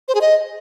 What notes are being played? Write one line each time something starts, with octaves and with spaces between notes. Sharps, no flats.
C5
G#4
D#5